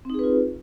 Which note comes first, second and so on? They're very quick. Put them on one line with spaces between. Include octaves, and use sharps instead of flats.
C4 D#4 G#4 B4 F4